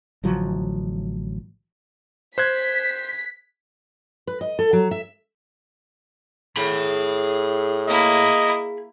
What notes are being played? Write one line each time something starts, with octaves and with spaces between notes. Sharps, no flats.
A1 D3 F3 F#3
C5 F#6 G#6 B6
B4
D#5
A4
F#3
E5
A2 G#4 B5
A#3 E4 D#5